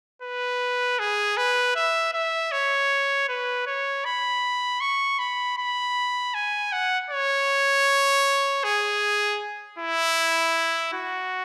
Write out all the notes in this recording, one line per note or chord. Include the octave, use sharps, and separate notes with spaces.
B4
G#4
B4
E5
E5
C#5
B4
C#5
B5
C#6
B5
B5
G#5
F#5
C#5
G#4
E4
F#4